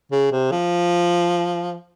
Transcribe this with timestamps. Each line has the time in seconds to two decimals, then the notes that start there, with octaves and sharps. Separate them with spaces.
0.12 C#3
0.32 C3
0.51 F3